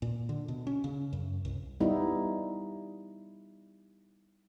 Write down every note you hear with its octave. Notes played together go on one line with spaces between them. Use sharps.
A#2
D3
B2
C#4
C#3
F#2
C2
G3 B3 D#4 E4